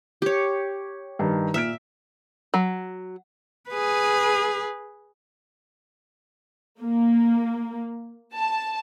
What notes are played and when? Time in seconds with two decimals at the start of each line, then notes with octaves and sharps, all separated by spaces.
0.22 G4 C#5
1.19 G2 D#3
1.54 A#2 E5 F6 D7
2.54 F#3
3.70 G#4 B4
6.80 A#3
8.35 A5